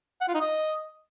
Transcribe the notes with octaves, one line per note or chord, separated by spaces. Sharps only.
F#5
F4
D#4
D#5